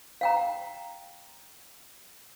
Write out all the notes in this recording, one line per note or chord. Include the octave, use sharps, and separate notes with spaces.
F5 G5 A#5